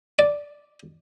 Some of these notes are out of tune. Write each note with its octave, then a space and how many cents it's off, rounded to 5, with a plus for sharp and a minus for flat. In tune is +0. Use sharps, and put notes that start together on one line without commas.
D5 -5